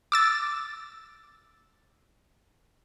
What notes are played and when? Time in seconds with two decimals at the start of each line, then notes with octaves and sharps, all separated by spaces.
0.12 D6 E6 A6